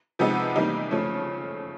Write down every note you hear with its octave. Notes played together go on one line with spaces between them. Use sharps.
C3 F3 G#3 B3 D#4
C3 E3 G3 A#3 D#4
C#3 F3 A3 C#4